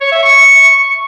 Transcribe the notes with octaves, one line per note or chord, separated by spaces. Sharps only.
C#5
E5
C#6